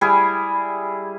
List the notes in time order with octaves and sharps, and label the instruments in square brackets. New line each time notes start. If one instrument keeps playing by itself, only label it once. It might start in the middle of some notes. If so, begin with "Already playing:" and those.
[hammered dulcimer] G3 E4 G#4